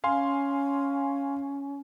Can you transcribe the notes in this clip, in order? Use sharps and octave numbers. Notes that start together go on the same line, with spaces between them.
C#4 F5 G#5 C6